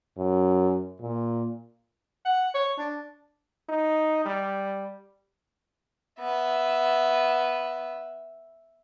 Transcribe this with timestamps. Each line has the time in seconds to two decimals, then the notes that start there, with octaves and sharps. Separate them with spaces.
0.17 F#2
1.01 A#2
2.25 F#5
2.54 C#5
2.78 D4
3.69 D#4
4.25 G3
6.20 B3 E5